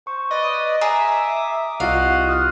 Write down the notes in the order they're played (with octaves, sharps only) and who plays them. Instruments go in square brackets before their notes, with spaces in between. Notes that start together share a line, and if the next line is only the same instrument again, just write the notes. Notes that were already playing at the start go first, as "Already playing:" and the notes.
[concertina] C5 [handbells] C#6
[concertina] B4 D5 D#6 [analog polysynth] D#5
[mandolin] G#4 [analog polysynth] E5 [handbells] A#5 [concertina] D6 D#6
[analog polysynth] C2 F4 [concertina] F#4 D#5 F#5 [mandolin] F5
[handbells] D#6 F6 F#6